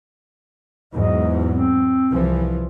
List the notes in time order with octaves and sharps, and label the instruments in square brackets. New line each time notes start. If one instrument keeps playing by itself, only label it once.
[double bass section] E2 G#2 F#3 [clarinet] D#5
[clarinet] C4
[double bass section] C2 E3 F3